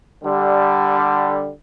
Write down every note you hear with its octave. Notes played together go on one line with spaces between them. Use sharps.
D3 G3